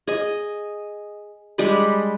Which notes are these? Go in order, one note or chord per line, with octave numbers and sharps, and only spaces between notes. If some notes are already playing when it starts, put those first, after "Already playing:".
G#4 D#5
G3 G#3 D4 B5